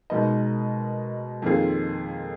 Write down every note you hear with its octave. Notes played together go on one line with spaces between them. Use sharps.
B2 G#3 D#4 A#4 D#5
F2 D#3 A#3 F4 G#4